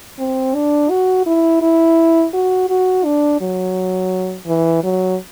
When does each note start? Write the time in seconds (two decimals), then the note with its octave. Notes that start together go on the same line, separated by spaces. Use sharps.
0.19 C4
0.55 D4
0.90 F#4
1.26 E4
1.62 E4
2.34 F#4
2.69 F#4
3.04 D4
3.41 F#3
4.47 E3
4.84 F#3